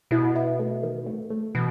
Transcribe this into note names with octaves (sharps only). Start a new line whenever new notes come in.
B2 E4
E4
A3
D#3
A3
A3
B2 E3